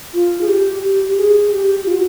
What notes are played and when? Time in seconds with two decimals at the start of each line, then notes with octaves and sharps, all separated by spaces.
0.14 F4
0.41 G#4
0.47 G4
0.82 G4
1.08 G4
1.17 G#4
1.51 G4
1.86 F4
1.93 F#4